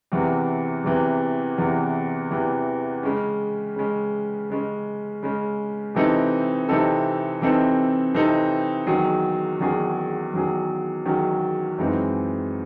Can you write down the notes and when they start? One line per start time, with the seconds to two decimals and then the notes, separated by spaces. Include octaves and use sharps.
0.12 E2 C3 E3
0.84 E2 C3 E3
1.58 E2 C3 E3
2.31 E2 C3 E3
3.03 C#3 G#3 C#4
3.76 C#3 G#3 C#4
4.50 C#3 G#3 C#4
5.23 C#3 G#3 C#4
5.95 C3 E3 C4 D#4 A4
6.69 C3 E3 C4 D#4 A4
7.41 C3 E3 C4 D#4 A4
8.15 C3 E3 C4 D#4 A4
8.87 E2 D#3 F#3 C#4 G#4
9.60 E2 D#3 F#3 C#4 G#4
10.34 E2 D#3 F#3 C#4 G#4
11.05 E2 D#3 F#3 C#4 G#4
11.78 F#2 E3 G#3 C4 D#4